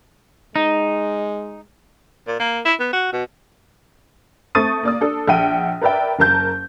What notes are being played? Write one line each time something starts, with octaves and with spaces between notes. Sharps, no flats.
G#3 D#4
A#2
A#3
E4
B3
F#4
B2
A3 C4 C#6 D#6 A6 D#7
A#3 D5 D#6
D4 A4
A#1 E5 F#5 G5 D#7
A#4 B4 D5 E5 G5
F#1 A#4 A5 G6